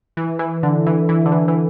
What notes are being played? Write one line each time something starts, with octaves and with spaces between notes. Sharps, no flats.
E3
E3
D3
E3
E3
D3
E3
E3